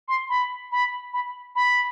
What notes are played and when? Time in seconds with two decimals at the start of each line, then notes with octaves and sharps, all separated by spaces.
0.08 C6
0.29 B5
0.72 B5
1.13 B5
1.56 B5